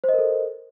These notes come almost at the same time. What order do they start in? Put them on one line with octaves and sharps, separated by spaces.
C5 D#5 A#4 A4